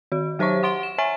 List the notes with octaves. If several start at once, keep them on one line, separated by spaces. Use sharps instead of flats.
D#3 F#4
F#3 G4 C5 C#5 C#6
F#5 C6 D7 G7
E7
C#5 E5 G#5 A6